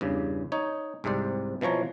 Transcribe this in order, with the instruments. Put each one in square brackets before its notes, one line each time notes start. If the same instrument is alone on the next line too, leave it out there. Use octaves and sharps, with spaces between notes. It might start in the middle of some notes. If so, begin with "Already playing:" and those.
[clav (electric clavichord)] E2 G2 C#3
D#4 C#5
C2 G#2 C3 C5 D5
B2 E3 F3 C#5 A#5